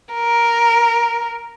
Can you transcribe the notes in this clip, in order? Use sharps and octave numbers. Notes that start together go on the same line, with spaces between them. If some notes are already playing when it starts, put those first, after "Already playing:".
A#4